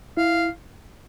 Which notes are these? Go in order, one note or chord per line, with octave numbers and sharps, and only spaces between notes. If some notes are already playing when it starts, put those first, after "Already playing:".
E4 F5